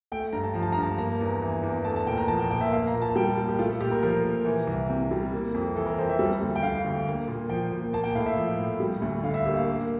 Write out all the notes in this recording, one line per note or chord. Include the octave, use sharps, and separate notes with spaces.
A3 G5
G2 A#5
A5
F3 A#5
A5
A#5
G2 A5
A#3 A#5
E2
E3
E2
A3 A5
A5
A#2 G5
A#5
F3 A5
G5
A#2 G5
E5
A#3 F5
A#5
A#2
A5
G3 G5
A#2
G4
A3 F4
A4
A#2 G4
A#4
F3 A#4
A#2
E3
C2
C3
G3
A#3
F2
E3 A4
A#4
F2 C5
E5
G3
D2
G5
D3 F5
D2
A#3
A#2
F3 G5
A#2
A#3 A5
G5
A2 F5
E5
F3
A2
G3
D2
D3 F5
E5
A#3 G4
F5
A#3